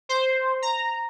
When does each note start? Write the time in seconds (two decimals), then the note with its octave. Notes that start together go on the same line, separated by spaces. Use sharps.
0.09 C5
0.62 A#5